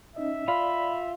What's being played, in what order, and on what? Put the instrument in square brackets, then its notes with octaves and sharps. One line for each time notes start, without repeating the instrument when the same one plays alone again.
[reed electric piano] C#4 D#4 D#5 [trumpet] E5
[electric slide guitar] F4 [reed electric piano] D5 F5 [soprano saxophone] B5